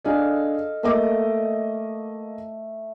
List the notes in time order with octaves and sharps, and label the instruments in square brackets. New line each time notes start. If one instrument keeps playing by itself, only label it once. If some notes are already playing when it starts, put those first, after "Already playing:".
[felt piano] D4 G#4 D5 [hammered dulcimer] A4 D#5 F5
[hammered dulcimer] A3 [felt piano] A#3 D#5 D6